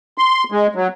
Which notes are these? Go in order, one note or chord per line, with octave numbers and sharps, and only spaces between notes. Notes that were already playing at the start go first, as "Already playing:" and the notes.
C6
G#3
F#3